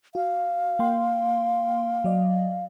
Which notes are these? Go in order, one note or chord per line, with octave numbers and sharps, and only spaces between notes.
F#4 F5
A#3 G5 C6
F#3 D5 D#5